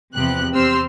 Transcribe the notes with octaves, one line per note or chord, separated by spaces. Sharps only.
E2 C3 F3 B3 G4 F#6
E2 C4 G4 C6 E6 F6